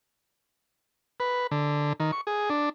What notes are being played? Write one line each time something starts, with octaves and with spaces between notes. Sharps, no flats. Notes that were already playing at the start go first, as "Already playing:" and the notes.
B4
D3
D#3
C#6
G#4
D4